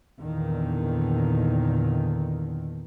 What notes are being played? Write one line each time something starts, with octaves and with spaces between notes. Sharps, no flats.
E2 A#2 D3 D#3